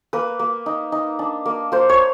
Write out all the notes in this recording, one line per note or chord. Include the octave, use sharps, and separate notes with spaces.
A#3 B4
A#3
D#4
D#4
D4
A#3
A#3 C5
C#5